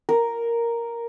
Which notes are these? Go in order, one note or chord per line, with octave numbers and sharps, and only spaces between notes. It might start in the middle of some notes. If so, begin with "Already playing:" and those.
A#4